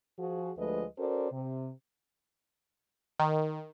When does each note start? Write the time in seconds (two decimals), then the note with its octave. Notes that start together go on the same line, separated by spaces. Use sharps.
0.19 F3 F#4 G#4
0.58 D2 F3 G#3 A3 B4 D#5
0.99 C#4 F#4 A4 A#4 C5 D5
1.32 C3
3.20 D#3